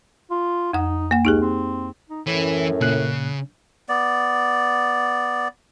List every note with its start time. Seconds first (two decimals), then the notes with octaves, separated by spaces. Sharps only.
0.31 F4
0.73 F2 D#4 F#5
1.11 A#3 F#5
1.25 C#2 D#4 G4 G#4
1.42 C4
2.10 D#4
2.27 F#2 A2 E3
2.81 A#2 C#3 F#6
3.89 B3 D5